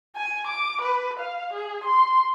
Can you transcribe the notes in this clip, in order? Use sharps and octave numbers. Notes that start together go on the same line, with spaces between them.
G#5
D6
B4
F5
G#4
C6